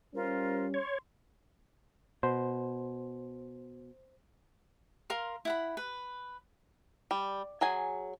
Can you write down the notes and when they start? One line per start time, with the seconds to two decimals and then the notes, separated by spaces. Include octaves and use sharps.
0.14 G3 C#4 F4 A#4 C5
0.74 C#5 C6
2.23 B2 C5
5.10 A#4 F5 C6
5.45 E4 F#5 B5
5.77 B4
7.11 G3
7.61 F#3 G#4 G#5